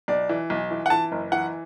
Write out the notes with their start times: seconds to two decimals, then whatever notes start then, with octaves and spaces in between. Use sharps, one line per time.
0.08 B1 D5
0.29 E3
0.50 B1
0.71 E3
0.86 F#5
0.90 E3 A5
1.12 F#1
1.32 E3 F#5